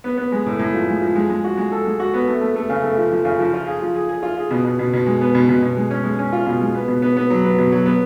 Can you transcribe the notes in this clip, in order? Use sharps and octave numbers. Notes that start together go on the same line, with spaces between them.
B3
B3
G#3
A2
A2
F3
G#3
F3
G#3
G#3
F#4
G#3
A4
G#3
F#4
B3
A3
A3
A3
C#3
A3
F3
F3
C#3
F3
F4
G#4
F3
G#4
G#4
F4
G#4
B2
B2
B2
B2
G#3
B3
B2
B2
B2
G#3
C#4
G#3
C#4
F4
B2
G#3
B3
B2
B3
B3
F#3
B3
B2
F#3
B3